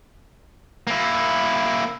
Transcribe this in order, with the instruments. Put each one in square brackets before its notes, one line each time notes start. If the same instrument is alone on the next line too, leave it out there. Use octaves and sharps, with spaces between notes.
[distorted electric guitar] A#3 E4